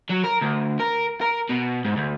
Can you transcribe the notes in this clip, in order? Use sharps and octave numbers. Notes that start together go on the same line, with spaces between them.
F#3
A#4
D2
A#4
A#4
B2
G#2
D2